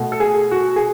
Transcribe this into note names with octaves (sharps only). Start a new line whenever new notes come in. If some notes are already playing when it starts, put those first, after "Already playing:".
Already playing: B2 A3
A4
G#4
F#4
G#4